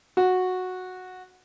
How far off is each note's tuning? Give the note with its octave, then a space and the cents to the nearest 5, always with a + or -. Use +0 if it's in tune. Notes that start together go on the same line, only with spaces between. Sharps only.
F#4 -10